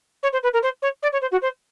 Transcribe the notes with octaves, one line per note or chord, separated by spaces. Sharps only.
C#5
C5
B4
A#4
C5
C#5
D5
C#5
C5
F#4
C5